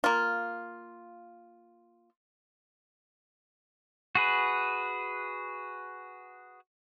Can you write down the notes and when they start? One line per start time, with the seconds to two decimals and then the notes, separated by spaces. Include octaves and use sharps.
0.04 A#3 F4
4.15 F#4 G#4 B4